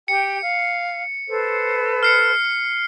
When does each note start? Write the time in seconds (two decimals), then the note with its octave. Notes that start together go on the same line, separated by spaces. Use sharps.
0.08 G4 G5 C#7
0.40 F5
1.28 A4 B4 C5
2.03 F6 C7 C#7